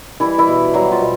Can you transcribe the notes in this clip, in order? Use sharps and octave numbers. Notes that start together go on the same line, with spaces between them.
E3 G3 E4
E3 E4
B2
F#3 G3 F#4
F3 F4
B2